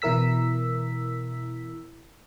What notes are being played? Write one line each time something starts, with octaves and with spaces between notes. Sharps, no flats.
B2 E3 E4 A#4 E6 B6